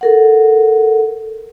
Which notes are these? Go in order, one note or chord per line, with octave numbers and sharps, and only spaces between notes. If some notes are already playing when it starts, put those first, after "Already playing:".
A4 A#4 F#5